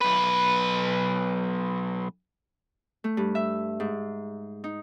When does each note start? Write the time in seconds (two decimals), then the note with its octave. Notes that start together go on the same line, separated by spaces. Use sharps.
0.01 B1 B4
3.04 A3
3.17 G2
3.35 E5
3.80 G#2
4.64 D#4